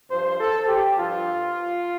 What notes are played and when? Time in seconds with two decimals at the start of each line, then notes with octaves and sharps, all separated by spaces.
0.11 G2 F3 C5
0.40 A4
0.69 G4
0.97 G2 F3 F4